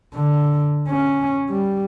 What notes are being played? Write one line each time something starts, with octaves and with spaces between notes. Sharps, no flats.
D3
C#4
G3